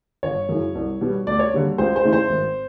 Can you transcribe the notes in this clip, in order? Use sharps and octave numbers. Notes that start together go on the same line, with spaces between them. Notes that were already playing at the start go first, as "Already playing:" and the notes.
G1 C#5
F#2 C#3 E3
C2
B2 G3 B3
D2 D5
C#5
D3 G3 A#3
C#2 C5
C5
C#3 E3 A3
C5
G#1